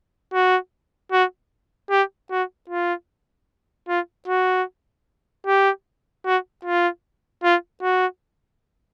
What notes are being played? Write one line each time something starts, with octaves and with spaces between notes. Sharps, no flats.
F#4
F#4
G4
F#4
F4
F4
F#4
G4
F#4
F4
F4
F#4